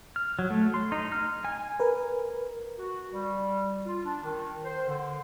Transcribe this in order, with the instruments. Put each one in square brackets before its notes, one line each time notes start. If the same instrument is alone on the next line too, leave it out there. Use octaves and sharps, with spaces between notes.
[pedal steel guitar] F6
F#3
A3
C6
D#4
F6
G#5
[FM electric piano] A#4 B4
[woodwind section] F#4
G3
F4
D4
D#3
C5
D3